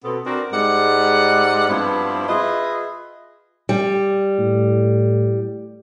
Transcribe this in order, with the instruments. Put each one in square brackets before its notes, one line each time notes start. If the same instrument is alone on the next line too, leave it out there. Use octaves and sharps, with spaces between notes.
[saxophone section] B2 B3 C4 A4
C4 D4 F#4 A#4
G#2 G3 G#3 F#5
G2 F3 B3 C4 E4
F4 G#4 B4 D#5 E5
[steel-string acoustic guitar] G3
[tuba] A2